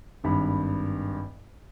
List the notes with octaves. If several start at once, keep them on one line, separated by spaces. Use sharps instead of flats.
G#1 G2 B5